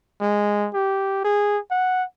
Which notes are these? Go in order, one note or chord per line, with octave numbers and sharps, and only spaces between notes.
G#3
G4
G#4
F#5